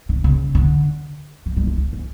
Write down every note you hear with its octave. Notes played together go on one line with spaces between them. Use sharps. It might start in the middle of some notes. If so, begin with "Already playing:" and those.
D3
C#3
D3
F3
G3
G#3
A3
C#4